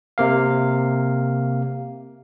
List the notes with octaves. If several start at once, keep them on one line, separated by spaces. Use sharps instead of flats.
C3 A#3 F5